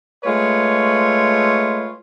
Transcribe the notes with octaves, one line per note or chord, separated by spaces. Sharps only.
G#3 A3 F4 B4 C#5